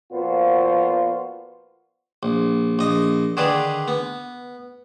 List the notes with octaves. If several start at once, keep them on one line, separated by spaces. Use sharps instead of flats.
A#2 F3 B3 F4 F#4 C5
A#1
A#1 D#5
D3 D#3 G#4 B4 D5
B3